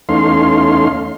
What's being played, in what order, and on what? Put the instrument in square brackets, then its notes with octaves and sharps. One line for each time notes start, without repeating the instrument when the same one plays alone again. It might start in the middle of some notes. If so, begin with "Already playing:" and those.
[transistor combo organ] E2 A3 C#4 D#4 F5 C6